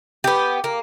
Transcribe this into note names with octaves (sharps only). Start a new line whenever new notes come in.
B3 G4
A#3